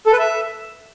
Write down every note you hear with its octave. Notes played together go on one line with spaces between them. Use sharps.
A4
B4
E5